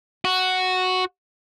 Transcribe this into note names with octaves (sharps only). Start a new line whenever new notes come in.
F#4